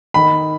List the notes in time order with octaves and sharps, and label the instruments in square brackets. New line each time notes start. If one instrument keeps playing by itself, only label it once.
[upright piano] D#3 B5